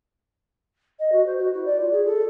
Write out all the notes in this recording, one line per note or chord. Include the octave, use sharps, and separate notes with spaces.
D#5
F#4
C5
F#4
E4
D5
F4
G#4
A4